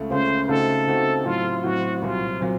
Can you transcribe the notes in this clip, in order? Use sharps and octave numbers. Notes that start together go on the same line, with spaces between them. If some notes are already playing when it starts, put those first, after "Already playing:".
Already playing: C#2 C#3 A3 C#4
C#2 C#3 A3 C#4 C5
C#3 A3 C4 D#4 F#4 A4
C#3 A3 C4 D#4 F#4
A2 F#3 C4 F4
A2 F#3 C4 F#4
C2 A#2 F#3 C4 F4
A#2 F#3 C4